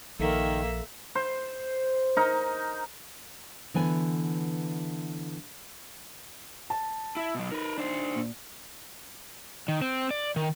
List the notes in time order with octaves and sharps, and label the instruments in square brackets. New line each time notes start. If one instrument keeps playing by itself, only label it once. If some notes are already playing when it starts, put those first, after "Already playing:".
[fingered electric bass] A#1 F3 [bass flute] D#3 [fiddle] A#3 E5 [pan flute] A4
[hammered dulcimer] C5
D#4 A#4
[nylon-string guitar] D3 E3 B3 G#5
[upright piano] A5
[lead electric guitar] E4
B2 F#3
[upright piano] D#4 [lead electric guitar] A#4 B4
[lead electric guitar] D4 C5
[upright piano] A#2
[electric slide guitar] D#3
C4
D5
D#3